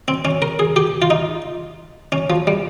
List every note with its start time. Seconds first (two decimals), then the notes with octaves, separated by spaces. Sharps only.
0.08 C4
0.25 C#4
0.42 A#4
0.59 G#4
0.76 G4
1.02 F4
1.10 D#4
2.12 C#4
2.30 F3
2.47 G3